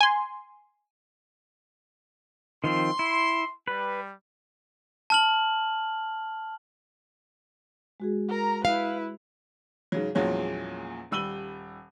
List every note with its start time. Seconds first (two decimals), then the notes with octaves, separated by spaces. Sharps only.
0.01 G#5 C6
2.64 D#3 F3 C4 C6
2.99 E4
3.68 G3 B4
5.10 A5 F6 F#7
8.00 G#3 F#4 G#4
8.29 A#4 A#5
8.65 E4 B4 F5
9.92 G#2 C#3 F#3
10.15 E2 A#2 F3 F#3 G#3 C#4
11.11 D#1 G3 E6 D#7 F#7 G7